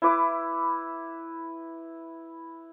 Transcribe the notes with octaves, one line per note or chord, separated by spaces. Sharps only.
E4 B4 D6